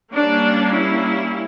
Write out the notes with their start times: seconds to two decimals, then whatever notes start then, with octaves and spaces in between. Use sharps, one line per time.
0.13 G3 A#3 C#4 D4
0.75 E4